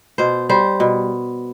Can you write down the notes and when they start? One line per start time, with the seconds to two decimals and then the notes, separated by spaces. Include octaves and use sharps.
0.18 B2 C5
0.49 G3 C5
0.80 B2